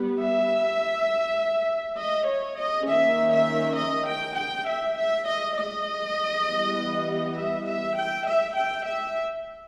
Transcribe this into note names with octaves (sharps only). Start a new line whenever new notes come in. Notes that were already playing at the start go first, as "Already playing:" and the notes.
Already playing: G3 B3
E5
D#5
C#5
D#5
D#3 A#3 C#4 E5
E5
D#5
G5
G5
E5
E5
D#5
D#5
E3 G3 B3
E5
E5
G5
E5
G5
E5